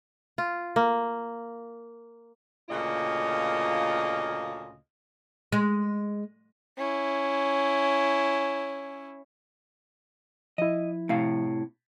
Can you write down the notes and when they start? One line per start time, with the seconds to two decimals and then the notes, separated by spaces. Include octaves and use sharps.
0.38 F4
0.76 A#3
2.69 D2 A#2 C#3 A#3 F4 D#5
5.52 G#3
6.77 C#4 E4
10.58 F3 E4 D#5
11.09 A2 C3 F5